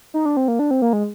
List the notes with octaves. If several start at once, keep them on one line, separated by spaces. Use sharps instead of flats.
D#4
D4
C4
A#3
D4
C4
A#3
G#3